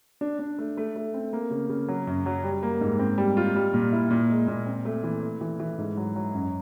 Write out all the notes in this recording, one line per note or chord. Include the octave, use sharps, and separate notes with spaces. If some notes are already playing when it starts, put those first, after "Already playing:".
D4
D4
A3
A3
A3
C4
A#3
C#3
C#3
F#3
F#2
F#3
G3
A#3
G#2
C4
G3
F4
G3
A#2
E4
A#2
G#3
A#2
C4
A3
E3
A3
E3
E3
G#2
F#3
F#3
F#2